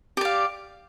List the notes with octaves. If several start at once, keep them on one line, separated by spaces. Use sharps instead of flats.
G4 D5 F5